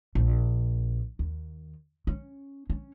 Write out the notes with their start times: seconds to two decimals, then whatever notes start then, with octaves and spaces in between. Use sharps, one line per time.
0.15 A#1
1.19 D#2
2.07 C#4
2.70 C#4